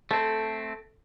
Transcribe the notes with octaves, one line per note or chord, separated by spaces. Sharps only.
A3 C4 A4